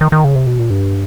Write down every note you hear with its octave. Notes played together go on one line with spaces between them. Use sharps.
D#3
D#3
C#3
C3
B2
A#2
G2